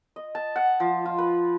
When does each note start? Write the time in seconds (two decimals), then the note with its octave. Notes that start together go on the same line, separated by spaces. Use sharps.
0.16 D#5
0.35 A5
0.56 F#5
0.80 F3
1.06 F4
1.18 B4